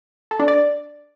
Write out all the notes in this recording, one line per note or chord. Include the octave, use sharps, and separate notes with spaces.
A4
D4
D5